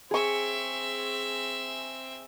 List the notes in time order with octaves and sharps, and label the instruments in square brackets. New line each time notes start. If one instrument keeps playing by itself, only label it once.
[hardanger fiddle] C4 E5 [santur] G#4 C#6